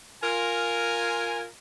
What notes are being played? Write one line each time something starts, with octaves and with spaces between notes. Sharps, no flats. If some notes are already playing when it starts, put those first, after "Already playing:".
F4 A#4 G#5